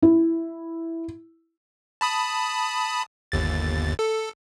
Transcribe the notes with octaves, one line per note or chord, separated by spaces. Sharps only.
E4
A5 B5 D#6
G1 D#2 A6
A4